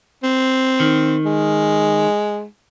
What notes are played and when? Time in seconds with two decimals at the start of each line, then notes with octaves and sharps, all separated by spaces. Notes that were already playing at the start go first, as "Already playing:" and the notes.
0.24 C4
0.80 D#3
1.25 G#3